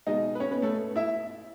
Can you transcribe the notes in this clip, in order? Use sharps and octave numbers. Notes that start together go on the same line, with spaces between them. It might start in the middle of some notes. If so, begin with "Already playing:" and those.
B2 G#3 D#4 D#5
B4
C#4 C#5
B3 B4
A3 A4
E4 E5